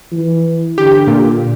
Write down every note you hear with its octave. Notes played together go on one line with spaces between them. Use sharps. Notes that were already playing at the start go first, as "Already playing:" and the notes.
E3
D3 G4
A#2